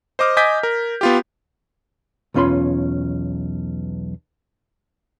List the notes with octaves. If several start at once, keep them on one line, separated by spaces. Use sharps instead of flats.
C5 D#5 D6 F6
D#5 G#5 D6 G6 G#6 B6
A#4
B3 F4 G4
B1 E2 C#4 F4 B5 C6